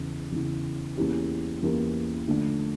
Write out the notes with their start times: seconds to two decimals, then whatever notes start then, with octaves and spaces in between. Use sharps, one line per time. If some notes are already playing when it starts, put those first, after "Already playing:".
Already playing: E2 C#3 E3
0.32 E2 C#3 E3
0.97 E2 E3 A#3 C#4 G4
1.63 E2 E3 A#3 C#4 G4
2.28 D3 F3 A3 D4